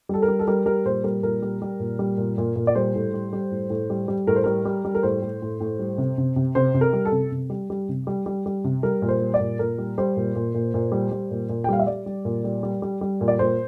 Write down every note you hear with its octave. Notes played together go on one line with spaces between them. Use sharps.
G3 A4
A#4
G3
A4
G3 A#4
G3 A#4
A#2 C5
G3 A#4
A#2 A#4
G3
G3
A#2
G3
A#2
A#2
A#2
D5
G3 C5
A2
G3
G3
A2
A2
G3
G3
A2 A#4
C5
G3 A#4
G3
G3
A#4
A2 C5
A2
A2
A2
G3
C3
C3
C3
C3 C5
C3
A#4
G3
A4
C3
C3
G3
G3
C3
G3
G3
G3
C3
G3 A#4
A#2
C5
G3
D5
A#2
A#2 A#4
G3
G3 C5
A#2
A#2
A#2
A#2
G3
G3
A#2
A#2
G5
G3 F5
E5
G3 D5
G3
A#2
G3
G3
G3
G3
A#2
D5
A#2 C5